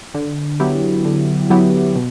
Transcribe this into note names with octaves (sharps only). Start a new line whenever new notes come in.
D3
F#3 B3 E4 G4
D3
F#3 B3 E4 G4
B2